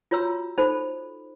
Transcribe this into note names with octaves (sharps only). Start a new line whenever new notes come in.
F4 F#4 C#5 A#5 E6
D#4 A4 C5 B5